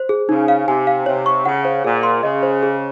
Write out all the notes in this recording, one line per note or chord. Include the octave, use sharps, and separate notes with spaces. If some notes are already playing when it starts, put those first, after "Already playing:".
Already playing: C5
G#4
C#3 D#4
F5
C3 G#5
F5
C3 C#5
C#6
C#3 F#5
C5
A#2 G#4
C6
C#3 D#5
C5
G#4